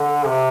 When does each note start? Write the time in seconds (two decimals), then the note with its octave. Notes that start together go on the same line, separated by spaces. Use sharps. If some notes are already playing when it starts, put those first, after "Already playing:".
Already playing: D3
0.27 C3